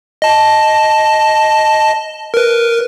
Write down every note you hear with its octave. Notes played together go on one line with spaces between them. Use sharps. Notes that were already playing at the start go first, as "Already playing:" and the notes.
D#5 A5
A#4 B4